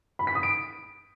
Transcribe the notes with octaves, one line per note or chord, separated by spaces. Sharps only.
B5
B6
D#6
D7